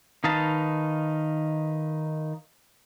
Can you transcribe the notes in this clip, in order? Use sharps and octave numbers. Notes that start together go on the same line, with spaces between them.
D#3 D#4 B4 F5 A5